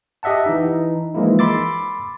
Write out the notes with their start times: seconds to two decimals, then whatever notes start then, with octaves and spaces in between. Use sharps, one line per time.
0.23 G4 D#5 E5 F#5 A5
0.46 E3 D#4
1.15 E3 F3 G#3 A#3 D#4 E4
1.39 B5 C6 D6 E6 A6